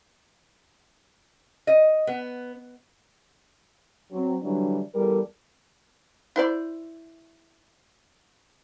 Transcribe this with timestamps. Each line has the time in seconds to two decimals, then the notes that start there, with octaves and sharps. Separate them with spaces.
1.67 D#5
2.07 B3
4.11 F#3 C4
4.42 D3 E3 F#3 G3 D4 E4
4.94 E2 G3 A4 A#4
6.36 E4 C5 D5